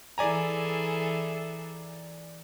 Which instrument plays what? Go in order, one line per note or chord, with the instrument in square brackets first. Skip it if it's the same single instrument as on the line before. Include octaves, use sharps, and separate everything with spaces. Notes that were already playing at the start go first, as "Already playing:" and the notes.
[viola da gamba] E3 G#4 A4 [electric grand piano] D5 G#5 A#5